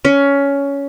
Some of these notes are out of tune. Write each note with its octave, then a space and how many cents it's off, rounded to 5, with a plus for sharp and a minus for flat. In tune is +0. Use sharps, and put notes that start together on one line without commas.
C#4 +15